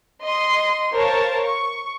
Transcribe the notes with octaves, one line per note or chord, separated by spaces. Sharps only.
D#5 C6
A#4 C5 C#5 F5 A5
C#6